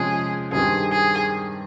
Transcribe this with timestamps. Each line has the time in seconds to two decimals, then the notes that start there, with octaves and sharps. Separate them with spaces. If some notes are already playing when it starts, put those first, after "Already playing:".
Already playing: C3 F3 G#3 C#4 G#4
0.52 G2 D#3 G3 C4 G#4
0.92 G#4